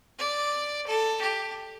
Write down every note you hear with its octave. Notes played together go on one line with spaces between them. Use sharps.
D5
A4
G4